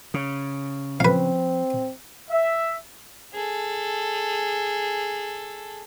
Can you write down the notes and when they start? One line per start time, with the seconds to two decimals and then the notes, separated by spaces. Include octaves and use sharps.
0.14 C#3
1.00 F3 C4 B4 F5
2.30 E5
3.34 G#4 A4